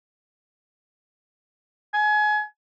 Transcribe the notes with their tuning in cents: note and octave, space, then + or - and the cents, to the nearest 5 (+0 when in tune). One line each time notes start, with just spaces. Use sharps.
G#5 +30